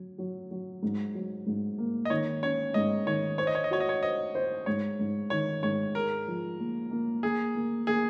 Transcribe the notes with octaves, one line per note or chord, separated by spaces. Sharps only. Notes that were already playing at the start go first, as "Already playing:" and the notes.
Already playing: F#3
F#3
F#3
G#2
F#3
G#2
A#3
D#5
D#3 C#5
C#4 C#5
G#2 D#5
D#3 C#5
C5 C#5
D#5
C#5
D#5
F#4 C#5
D#5
C#5
C5 D#5
C5
G#2 C#5
G#2
D#3 C#5
G#2 C#5
G#4 A#4
F3
A#3
A#3
A#3 G#4
A#3
A#3 G#4